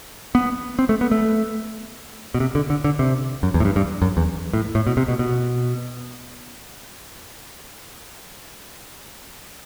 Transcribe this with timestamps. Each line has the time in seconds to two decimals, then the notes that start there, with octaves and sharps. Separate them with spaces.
0.35 B3
0.79 C4
0.89 A3
1.01 B3
1.11 A3
2.34 B2
2.40 C3
2.55 D3
2.70 D3
2.84 D3
2.99 C3
3.43 F#2
3.54 E2
3.60 A2
3.65 G2
3.76 G2
4.02 F#2
4.17 E2
4.53 A2
4.75 A2
4.87 B2
4.97 C3
5.08 B2
5.19 B2